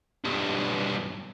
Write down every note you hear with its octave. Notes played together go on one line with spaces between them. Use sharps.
B1 G2